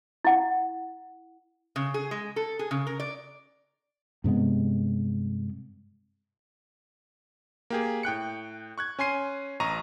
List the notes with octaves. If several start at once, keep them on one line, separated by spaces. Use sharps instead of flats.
E4 F#5
C#3
G#4
G#3
A4
G#4
C#3
A#4
D5
G2 C3 G#3 B3
A#3 G4 G#4
A2 G5 F#6 C#7
C#6 F#6 G#6
C#4 G#5 C6 C7 D#7
A1 D#5 A#5 C#6 A#6 D#7